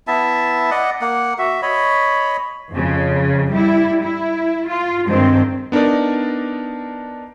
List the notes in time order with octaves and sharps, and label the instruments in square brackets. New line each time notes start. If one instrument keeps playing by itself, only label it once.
[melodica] B3 E4 E5 A5
D5 D#5 F#5
A#3 F#5
F#4 E5
C#5 D#5 B5
[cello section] F2 C#3
G3 E4
E4
F4
G2 D#3 G#3 C4
[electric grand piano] B3 D4 D#4 A#4 D5